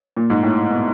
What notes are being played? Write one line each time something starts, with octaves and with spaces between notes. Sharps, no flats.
A#2
G#2
A2
B2